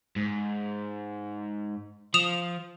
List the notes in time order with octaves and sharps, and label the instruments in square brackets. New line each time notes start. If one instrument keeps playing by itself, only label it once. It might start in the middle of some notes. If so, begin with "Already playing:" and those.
[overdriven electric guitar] G#2
[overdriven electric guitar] F3 [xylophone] D#6 E7 F7